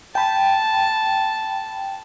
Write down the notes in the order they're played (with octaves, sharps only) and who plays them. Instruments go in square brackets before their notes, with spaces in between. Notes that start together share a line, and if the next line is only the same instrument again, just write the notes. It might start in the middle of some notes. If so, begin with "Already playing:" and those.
[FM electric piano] G5 B5 [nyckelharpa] A5